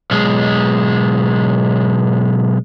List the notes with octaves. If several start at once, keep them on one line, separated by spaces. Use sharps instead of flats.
B1 G#3